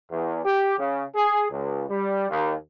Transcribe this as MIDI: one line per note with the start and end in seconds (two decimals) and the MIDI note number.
0.11 0.40 40
0.45 0.75 67
0.78 1.03 49
1.15 1.46 68
1.50 1.85 37
1.90 2.27 55
2.30 2.54 39